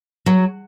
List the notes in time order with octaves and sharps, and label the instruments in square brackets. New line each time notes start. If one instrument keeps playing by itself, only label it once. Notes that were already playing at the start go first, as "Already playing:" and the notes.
[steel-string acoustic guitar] F#3